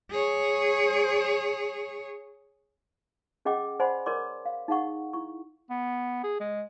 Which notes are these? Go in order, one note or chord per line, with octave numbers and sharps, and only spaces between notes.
G#4 C#5
C#4 G#4 D#5 F#5 G5 D6
C5 D5 F#5 G#5 B5 C6
A#4 C#5 D5 C6 D6
F5
D#4 G#4 F5 F#5 C#6
E4 C#6
B3
G#4
G#3